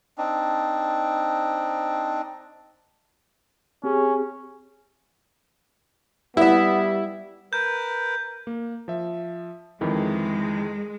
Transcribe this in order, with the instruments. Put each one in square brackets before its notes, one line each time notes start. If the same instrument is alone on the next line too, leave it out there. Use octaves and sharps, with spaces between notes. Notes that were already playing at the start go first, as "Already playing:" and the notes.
[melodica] C4 D4 D#4
[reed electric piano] C4 G4 G#4 [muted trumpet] C#4
[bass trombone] G3 [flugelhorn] B3 [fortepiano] E4 E5
[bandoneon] A#4 B4 [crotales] G6
[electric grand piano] A#3
F3 E5
[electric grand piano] F2 D#3 E3 [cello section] G#3